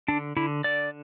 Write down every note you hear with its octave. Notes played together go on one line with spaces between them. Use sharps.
D3 D4
D3 E4
D3 D5